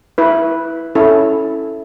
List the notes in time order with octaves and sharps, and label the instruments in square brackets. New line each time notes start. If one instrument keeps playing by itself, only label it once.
[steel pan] E4 B4
C#4 E4 A4